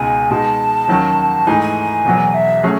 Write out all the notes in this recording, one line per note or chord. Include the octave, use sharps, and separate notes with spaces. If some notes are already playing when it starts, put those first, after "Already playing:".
Already playing: C#2 B2 G#3 D#4 G#5
B2 G#3 D#4 G#4 A5
D#2 D#3 F#3 C#4
G#2 E3 A3 D#4 G#4 G#5
G#5
E1 E2 B2 F#3
E5
F#3 A3 C#4 G#4